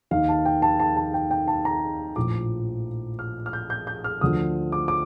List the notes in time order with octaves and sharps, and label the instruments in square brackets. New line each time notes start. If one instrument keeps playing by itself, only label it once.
[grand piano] D#2 D#3 F5
A5
G5
A5
A5
A5
G5
G5
A5
A#5
A#1 A2 F3 D6
F6
F6
G6
G6
G6
F6
D2 D3 F3 D#6
D6
D6